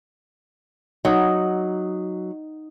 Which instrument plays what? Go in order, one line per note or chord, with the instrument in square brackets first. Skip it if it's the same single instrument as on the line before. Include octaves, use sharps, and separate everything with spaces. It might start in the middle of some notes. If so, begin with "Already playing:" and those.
[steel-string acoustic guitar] F#3 [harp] D#4